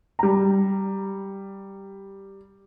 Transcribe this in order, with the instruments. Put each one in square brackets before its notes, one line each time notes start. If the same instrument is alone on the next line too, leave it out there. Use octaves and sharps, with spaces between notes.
[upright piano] G3 A#5